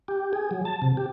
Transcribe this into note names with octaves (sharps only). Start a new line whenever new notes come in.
G4
G#4
F#3
A5
C3
G4